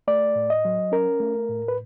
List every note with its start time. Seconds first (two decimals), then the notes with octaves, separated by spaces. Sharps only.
0.08 A3 D5
0.35 A2
0.50 D#5
0.65 F#3
0.92 C#4 A#4
1.20 A3
1.49 A2
1.68 B4